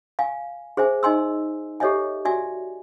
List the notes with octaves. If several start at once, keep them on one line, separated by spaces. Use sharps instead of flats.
F5 G#5
G#4 C5 E5 G#5
D#4 D#5 G#5 C6 E6
G4 A4 C#5 D#5 E5 G#5
F#4 D5 E5 G#5